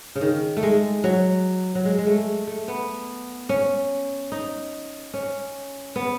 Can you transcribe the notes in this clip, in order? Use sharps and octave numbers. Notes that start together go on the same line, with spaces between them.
C#3
D#3
A3
G#3
F#3
F#3
G#3
G#3
A3
A3
B3
C#4
D#4
C#4
B3